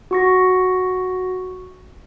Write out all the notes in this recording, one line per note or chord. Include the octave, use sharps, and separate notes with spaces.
F#4 C#6 A#6